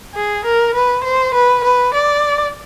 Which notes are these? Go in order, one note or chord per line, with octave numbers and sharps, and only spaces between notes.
G#4
A#4
B4
C5
B4
B4
D5